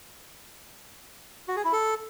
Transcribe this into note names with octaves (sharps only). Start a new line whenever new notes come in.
F#4
G#4
E4
A4